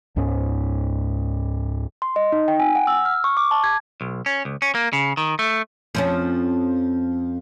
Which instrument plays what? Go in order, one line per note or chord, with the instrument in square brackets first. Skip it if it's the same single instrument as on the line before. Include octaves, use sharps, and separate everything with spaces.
[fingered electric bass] C#2 G#2 C#4
[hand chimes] C6
D#5
D#4
G5
G#5
F#5
E6
F6
C#6
D6
A5
G#6
[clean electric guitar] B1
C#4
C#2
C#4
A#3
C#3
D#3
A3
[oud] F2 F3 C#4